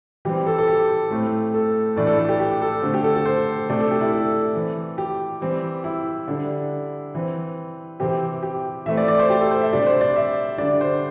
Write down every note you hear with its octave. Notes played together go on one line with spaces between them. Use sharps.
E3 G3 C4 G4
A4
A4
G4
A2 A3 C4
A4
A2 E3 A3 D4 D5
A4
A4
G4
G4
A4
D3 A3 C4
G4
A4
A4
C5
C3 A3 D4 D5
A4
G4
E4
A4
E3 C4
G4
E3 G3 C4
E4
D3 G3 D4
E3 C4
C3 E3 C4 G4
G4
E3 A3 C4 E5
D5
D5
C5
G4
A4
C5
E5
C3 G3 D4 D5
C5
D5
E5
D3 G3 D4 D5
C5